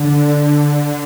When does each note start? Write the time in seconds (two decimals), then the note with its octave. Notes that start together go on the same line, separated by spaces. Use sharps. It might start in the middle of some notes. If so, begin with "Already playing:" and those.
Already playing: D3